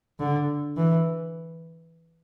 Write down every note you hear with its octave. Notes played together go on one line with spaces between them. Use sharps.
D3
E3